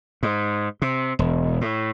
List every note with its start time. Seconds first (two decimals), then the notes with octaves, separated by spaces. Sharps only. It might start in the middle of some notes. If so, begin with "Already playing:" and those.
0.23 G#2
0.82 C3
1.19 E1
1.61 A2